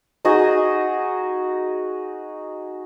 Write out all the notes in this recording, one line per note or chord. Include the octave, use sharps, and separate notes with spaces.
D#4 F#4 G#4 D#5